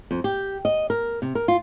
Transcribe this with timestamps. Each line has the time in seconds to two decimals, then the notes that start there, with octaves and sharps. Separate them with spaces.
0.11 F2
0.24 G4
0.65 D#5
0.90 A#4
1.22 C3
1.35 A#4
1.48 F4